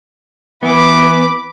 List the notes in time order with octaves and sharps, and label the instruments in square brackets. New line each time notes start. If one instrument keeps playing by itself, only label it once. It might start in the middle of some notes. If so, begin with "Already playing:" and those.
[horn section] E3 [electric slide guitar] B3 [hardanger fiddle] B5 D6